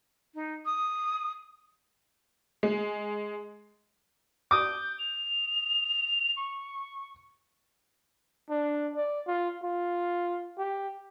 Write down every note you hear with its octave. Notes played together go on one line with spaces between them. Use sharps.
D#4
D#6
G#3
D6 D#6 G6
F7
C#6
D4
D5
F4
F4
G4